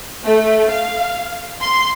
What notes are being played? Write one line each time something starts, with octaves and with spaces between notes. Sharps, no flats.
A3
F5
C6